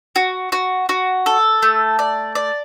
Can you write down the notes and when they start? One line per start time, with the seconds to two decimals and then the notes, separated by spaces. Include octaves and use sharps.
0.16 F#4
0.52 F#4
0.89 F#4
1.26 A4
1.62 A3
1.99 D5
2.35 D5